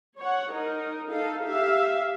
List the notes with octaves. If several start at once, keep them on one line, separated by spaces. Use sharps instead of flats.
C#5 F#5
D#4 A#4
D#4 A4 F5
G4 E5 F5